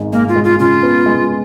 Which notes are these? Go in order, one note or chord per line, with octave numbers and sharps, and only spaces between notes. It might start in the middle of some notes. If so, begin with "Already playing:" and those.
Already playing: G#1 G#3 D#4
G#3 A#3
F4
G#3
F4
C#3 F4
B3
G#3